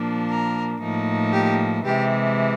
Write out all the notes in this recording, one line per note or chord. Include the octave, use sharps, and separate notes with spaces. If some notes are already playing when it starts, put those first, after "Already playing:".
Already playing: A#2 F3 A#3 D4
A#4
A2 F3 A#3 D#4
G4
C3 E3 G#3 G4